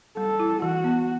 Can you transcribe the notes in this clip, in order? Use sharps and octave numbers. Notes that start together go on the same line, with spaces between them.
G3 A4
E4
E3 F#4
B3